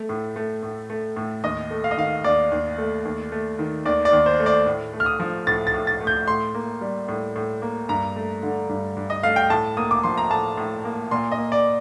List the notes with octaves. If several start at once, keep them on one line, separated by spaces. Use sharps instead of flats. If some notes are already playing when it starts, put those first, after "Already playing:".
Already playing: A3
A2
A3
A2
A3
A2
D#2 D#5
A3
F5
D#5
D#3 F5
D#2 D5
D#2
A3
D#2
A3
D#3
D#2 D5
D5
D#2
C5
A3
D5
A2
A3
F6
D#6
F3
A2 A6
A6
A2
A6
A3
G6
A2 C6
A#3
G3
A2
A2
A#3
G2 A#5
A3
D3
G2
G2
D#5
A3 F5
G5
A2 A5
A#3 D#6
D6
F3 C6
A#5
A2 A5
A2
A#3
A#2 C6
D#5
A#3
D5